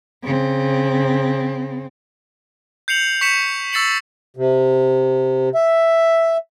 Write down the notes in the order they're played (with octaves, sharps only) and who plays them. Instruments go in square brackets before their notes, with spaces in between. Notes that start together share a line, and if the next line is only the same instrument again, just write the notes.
[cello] C#3 C4
[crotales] G6 C7 C#7 F7 F#7
C#6 B6 C#7 E7
C#6 E6 A6 C7 C#7 F#7
[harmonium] C3
E5